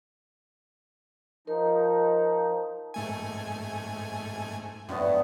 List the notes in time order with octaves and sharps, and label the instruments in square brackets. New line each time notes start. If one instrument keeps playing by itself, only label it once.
[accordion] F3 D#4 [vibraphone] A#4
[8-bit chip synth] G#2 A3 G#5
[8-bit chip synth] F#2 [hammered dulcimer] A2 D3 B3